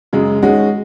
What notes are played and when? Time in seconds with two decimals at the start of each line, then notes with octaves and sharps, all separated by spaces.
0.13 F#2 C#3 G#3
0.42 D#3 G#3 C#4 F#4